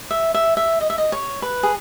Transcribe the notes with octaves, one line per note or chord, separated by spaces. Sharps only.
E5
E5
E5
D#5
E5
D#5
C#5
B4
G#4